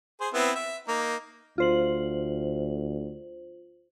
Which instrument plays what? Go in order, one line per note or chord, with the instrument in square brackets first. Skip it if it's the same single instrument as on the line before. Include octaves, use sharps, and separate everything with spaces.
[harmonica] G#4 C5
B3 C4 E4
E5
A#3 D#4
[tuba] D2 [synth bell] F4 C5 F#7